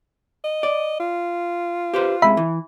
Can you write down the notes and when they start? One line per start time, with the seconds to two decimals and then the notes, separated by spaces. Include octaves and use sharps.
0.44 D#5
0.63 D5
1.00 F4
1.94 G4 B4 C5
2.22 C3 G#3 E5 B5
2.37 E3